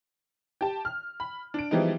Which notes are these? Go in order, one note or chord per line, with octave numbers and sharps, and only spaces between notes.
G4 A5
F6
B5
D4 D7
E3 F3 G3 G#3 B3 D#4